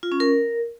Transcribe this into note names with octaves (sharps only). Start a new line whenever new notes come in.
F4
C#4
A#4